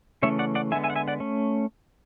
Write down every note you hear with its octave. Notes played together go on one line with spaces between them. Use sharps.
C#3 E3 A3 C#4 C#5 E5
D5 F#5
D5 F#5
D3 G#3 B3 E5 G#5
E5 G#5
F#5
E5 G#5
D5 F#5
A3 C#4